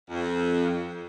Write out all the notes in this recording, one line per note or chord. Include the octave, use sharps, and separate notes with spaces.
F2